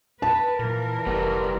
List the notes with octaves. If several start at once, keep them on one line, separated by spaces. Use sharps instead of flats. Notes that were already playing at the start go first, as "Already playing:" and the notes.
B4 A5
A#2 E3 A#4
F1 G3 B3